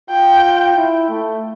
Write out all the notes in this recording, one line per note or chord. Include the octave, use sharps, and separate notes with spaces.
F4 G5
E4
A3